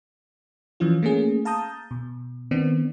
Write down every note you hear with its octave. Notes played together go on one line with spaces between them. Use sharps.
E3 F3 C#4 F4
A3 A#3 C#4 G#4
F5 A5 A#5 D#6 G6
B2
D#3 B3 C4 D4